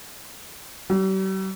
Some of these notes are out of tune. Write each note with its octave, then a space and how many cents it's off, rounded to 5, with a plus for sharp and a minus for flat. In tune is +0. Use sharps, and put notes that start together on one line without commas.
G3 -45